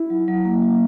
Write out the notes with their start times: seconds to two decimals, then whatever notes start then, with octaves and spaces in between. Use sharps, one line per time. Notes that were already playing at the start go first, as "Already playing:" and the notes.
Already playing: E4
0.10 F#3
0.28 F#3
0.45 A#3
0.62 F#3